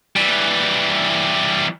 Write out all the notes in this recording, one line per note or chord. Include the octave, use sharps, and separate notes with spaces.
E3 G3